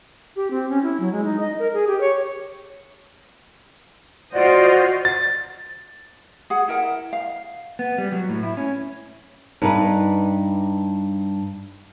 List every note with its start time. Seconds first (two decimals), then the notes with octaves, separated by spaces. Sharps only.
0.36 G4
0.51 C4
0.69 C#4
0.83 E4
1.00 F#3
1.12 G#3
1.25 D#4
1.40 D#5
1.59 A#4
1.73 G#4
1.87 G4
2.01 C#5
4.33 F4 F#4 C5 D5 D#5 F#5
5.05 A6
6.50 G#4 F#5
6.68 E4 A#4 F#5
7.13 F5
7.79 B3
7.98 G3
8.12 F#3
8.29 A2
8.43 E4
8.57 C#4
9.62 G2 D#4 B4